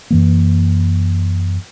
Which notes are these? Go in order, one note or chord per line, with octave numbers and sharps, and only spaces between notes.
F#2 E3 A#3